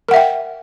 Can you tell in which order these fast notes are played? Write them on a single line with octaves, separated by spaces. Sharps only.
A#4 F#5 E5 G5